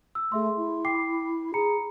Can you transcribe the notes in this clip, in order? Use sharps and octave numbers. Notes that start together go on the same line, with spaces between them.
E6
A3 G#4 E5 C6
E4
G5 D6 C7
G#4 A#5 B5 C#7